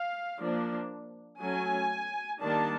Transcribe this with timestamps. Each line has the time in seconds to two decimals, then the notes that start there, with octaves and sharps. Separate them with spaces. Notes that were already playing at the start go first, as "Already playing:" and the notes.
Already playing: F5
0.39 F3 A#3 D4
1.41 F#3 A3 C#4 G#5
2.41 D#3 G3 A#3 D4 A5